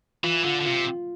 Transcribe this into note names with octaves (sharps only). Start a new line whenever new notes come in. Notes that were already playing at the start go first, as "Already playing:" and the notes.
E3 F4
D3 F4
D3
C3 F4